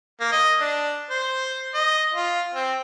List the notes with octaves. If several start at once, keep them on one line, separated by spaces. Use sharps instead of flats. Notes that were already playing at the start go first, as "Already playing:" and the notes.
A#3
D#5
D4
C5
D#5
F4
C4